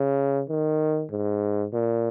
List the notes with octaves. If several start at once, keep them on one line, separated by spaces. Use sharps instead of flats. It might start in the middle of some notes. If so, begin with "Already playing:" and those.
Already playing: C#3
D#3
G#2
A#2